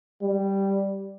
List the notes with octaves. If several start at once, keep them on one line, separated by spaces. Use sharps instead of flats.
G3